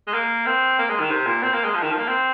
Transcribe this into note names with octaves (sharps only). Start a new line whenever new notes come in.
G#3
A#3
C4
A#3
G#3
D#3
C3
A#2
C4
A#3
G#3
F3
D#3
F3
A#3
C4